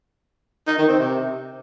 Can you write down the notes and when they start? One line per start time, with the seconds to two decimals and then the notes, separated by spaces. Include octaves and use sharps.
0.67 D#4
0.78 D#3
0.88 C4
0.99 C3